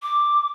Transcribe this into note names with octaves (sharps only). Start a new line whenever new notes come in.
D6